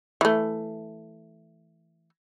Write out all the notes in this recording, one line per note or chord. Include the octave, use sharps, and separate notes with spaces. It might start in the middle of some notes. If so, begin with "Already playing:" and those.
E3 A3